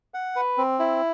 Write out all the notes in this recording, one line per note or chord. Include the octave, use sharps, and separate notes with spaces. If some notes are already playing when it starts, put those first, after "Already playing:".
F#5
B4
C4
E4